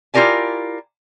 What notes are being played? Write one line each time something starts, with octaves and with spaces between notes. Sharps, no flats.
E4 F4 G4 A#4 D5 G#5